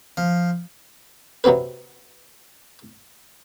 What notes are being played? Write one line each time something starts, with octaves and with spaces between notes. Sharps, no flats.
F3
C3 F#3 B3 C4 B4